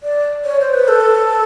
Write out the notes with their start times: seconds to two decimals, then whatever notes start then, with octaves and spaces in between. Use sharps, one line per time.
0.03 D5
0.45 C#5
0.60 C5
0.74 B4
0.88 A4